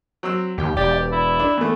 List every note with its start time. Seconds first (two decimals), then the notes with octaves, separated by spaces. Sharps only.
0.23 F#3 C4 E6
0.58 D#2 G4 G5
0.77 E1 G4 D5
1.12 E4
1.40 D4
1.58 E2 A3